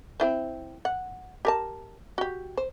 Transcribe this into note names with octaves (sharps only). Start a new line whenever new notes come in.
C4 E4 C5
F#5
G4 A#4 A5
F#4 G4
C5